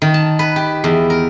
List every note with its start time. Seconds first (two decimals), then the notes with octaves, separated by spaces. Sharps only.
0.02 D#3
0.14 A5
0.39 B4
0.56 G4
0.84 E2
1.10 A#4